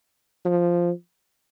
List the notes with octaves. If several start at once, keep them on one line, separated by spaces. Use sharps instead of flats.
F3